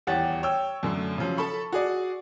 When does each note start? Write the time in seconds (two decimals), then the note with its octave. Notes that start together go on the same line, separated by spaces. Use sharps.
0.07 D#1 E2 G4 C#5 F#5 A6
0.43 C#5 G5 E6
0.83 F#2 D3 A3
1.18 C#3 F3 F#3
1.37 A4 A5 B5 C#6
1.72 F#4 G#4 D5